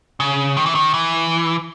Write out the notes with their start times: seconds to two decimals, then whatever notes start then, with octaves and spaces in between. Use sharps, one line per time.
0.20 C#3
0.57 D#3
0.66 E3
0.75 D#3
0.94 E3